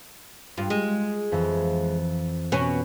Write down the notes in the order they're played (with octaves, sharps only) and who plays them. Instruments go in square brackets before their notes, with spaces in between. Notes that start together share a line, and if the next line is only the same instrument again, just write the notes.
[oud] G2 [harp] F4
[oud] G#3
[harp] F2 E3
[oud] B2 B3 C#4